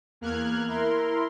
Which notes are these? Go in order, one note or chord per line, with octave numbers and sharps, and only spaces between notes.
E2 A#3 F6 F#6 G#6
E4 A#4 C6